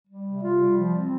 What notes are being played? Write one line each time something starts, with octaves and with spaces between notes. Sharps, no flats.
G3
C3
F4
G3
F3
C4